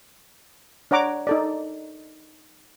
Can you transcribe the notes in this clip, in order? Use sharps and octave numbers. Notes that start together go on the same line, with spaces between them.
D4 C#5 F#5 A#5 D6
D#4 A4 D5